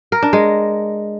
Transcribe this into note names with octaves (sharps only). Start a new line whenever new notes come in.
A#4
D4
G#3